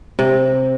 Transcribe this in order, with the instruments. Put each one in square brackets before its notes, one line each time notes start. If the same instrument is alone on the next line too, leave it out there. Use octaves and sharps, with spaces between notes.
[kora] C3